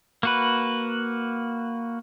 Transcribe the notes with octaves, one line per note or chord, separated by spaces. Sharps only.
A#3 F#4 B4